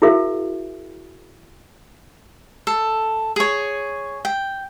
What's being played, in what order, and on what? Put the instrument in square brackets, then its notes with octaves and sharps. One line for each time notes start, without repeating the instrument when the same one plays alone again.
[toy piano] E4 F#4 G#4 A#4 E5 F5
[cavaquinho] A4
G#4 C#5
G5